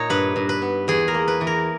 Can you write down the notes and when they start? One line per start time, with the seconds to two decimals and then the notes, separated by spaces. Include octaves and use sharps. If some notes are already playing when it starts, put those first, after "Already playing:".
Already playing: A#2 D#4 C#5
0.10 G2 B4
0.36 G2
0.49 B4
0.62 B3
0.88 E2 G#4
1.08 A#4
1.14 A#3
1.28 B4
1.41 E3
1.47 A#4